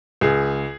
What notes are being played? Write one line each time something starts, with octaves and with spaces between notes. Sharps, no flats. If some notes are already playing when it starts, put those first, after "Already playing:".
C#2 G#4